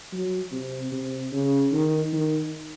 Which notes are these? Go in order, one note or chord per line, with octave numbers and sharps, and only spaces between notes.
F#3
C3
C3
C#3
D#3
D#3